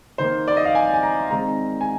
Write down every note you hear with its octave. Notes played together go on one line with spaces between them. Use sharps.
D#3 A#3 C5
D5
D#5
F5
G#5
G#5
A#5
D#3 G#3 C4 A#5
G#5